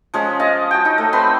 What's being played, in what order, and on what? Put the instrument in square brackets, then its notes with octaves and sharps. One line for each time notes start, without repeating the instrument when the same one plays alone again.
[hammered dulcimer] F3 G#3 C#4
D#5 F5 A5
F#4 G5
D#4
A3
C4 B4 B5 C6